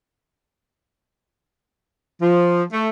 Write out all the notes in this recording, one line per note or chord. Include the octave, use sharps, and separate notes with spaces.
F3
A3